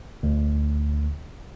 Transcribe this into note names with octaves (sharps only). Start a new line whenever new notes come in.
D2